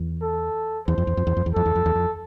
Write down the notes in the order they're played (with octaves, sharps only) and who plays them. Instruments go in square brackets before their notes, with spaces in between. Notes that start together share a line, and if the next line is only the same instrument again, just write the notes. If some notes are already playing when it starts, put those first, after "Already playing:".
Already playing: [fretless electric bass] E2
[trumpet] A4
[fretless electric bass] E2 [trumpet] C5
[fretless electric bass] F2
E2
F2
E2
F2
E2
[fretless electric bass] F2 [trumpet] A4
[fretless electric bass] E2
F2
E2
F2